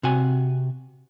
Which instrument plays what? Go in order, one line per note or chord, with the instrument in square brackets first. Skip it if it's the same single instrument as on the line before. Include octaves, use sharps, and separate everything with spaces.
[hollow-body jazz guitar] C3 F#4 G#5